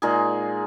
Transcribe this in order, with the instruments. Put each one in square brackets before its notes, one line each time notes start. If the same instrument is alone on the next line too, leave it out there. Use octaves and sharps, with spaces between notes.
[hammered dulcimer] A#2 G#3 D#4 G#4